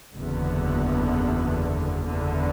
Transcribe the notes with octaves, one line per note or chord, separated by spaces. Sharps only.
F#1 E2 D3 B3
F#1 E2 D3